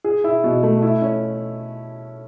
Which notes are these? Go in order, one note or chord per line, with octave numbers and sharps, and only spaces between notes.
G#4
E4
B2
A3
E4
C#4